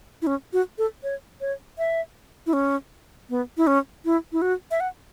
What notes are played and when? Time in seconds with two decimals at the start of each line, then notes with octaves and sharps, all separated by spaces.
0.22 E4
0.27 C#4
0.53 F#4
0.78 A4
1.03 C#5
1.41 C#5
1.78 E5
2.47 E4
2.53 C#4
3.30 B3
3.57 E4
3.67 C#4
4.05 E4
4.32 E4
4.42 F#4
4.71 E5
4.80 F#5